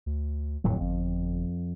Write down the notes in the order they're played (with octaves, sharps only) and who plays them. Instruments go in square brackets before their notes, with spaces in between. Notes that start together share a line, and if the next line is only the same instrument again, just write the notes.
[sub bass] D2
[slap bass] D1 F2 F#3 [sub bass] A2
[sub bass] G1 [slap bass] F2